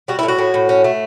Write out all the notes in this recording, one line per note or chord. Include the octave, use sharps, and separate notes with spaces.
G3 F#4
E4
A2
F#4
A2
A2
C#4
A3